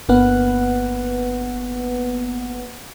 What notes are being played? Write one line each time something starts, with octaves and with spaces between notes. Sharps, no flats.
G1 A#3 B3 B4 F#5